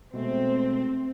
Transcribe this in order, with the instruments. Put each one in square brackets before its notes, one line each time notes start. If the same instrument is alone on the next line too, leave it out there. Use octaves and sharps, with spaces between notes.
[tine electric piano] B2 G#3 A3 [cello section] C4